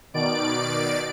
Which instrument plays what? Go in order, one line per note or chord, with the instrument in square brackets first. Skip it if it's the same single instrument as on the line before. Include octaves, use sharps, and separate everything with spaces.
[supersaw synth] B2 D#3 D5 D7